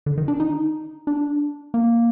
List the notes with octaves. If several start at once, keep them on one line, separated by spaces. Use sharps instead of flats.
D3
D#3
D4
D#4
D4
A#3